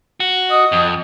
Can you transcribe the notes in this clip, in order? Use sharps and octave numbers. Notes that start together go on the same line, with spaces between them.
F#4
D#5 D#6
F2